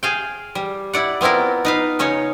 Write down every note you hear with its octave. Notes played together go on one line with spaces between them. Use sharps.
G#4 F5 G5
G3
E4 D5 F#5
B3 C4 E4 F4 A#4
D#4 B4 F5
C#3 C#4 D#4 C#5